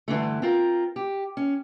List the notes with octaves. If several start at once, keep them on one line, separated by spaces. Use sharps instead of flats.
G2 D3 E3 A3
C4 F4 A#4
G4
C#4